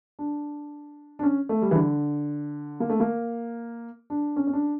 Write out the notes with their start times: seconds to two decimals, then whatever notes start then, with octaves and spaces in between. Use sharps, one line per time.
0.19 D4
1.19 D4
1.23 C#4
1.49 A3
1.62 G3
1.71 E3
1.75 D3
2.80 A#3
2.90 A3
3.00 A#3
4.10 D4
4.36 C#4
4.47 C#4
4.53 D4